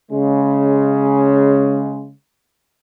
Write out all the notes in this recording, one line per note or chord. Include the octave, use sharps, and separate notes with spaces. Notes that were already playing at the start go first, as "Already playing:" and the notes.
C#3 G#3